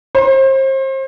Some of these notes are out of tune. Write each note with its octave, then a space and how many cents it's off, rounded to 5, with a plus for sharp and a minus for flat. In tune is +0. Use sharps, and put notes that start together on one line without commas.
C5 +35